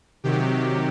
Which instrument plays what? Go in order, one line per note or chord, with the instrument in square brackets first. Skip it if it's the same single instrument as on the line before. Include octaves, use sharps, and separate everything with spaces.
[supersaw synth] C3 D#3 F#3 G4